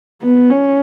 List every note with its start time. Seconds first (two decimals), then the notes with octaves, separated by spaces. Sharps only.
0.22 B3
0.51 C#4